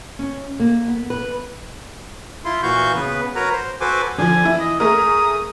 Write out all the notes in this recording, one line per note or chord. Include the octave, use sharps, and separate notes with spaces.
C#4
A#3
B3
B4
E4 F4 C6
A#2 E3 F#4 F5 C#6 G6
C#3 B3 B4
F#4 A#4 B4 C#5 A#5
C5
F#4 A4 B4 C5 G#5 D6
D3 F3 G#5
E3 E4
D#5
A3 G#4 A#4 D#6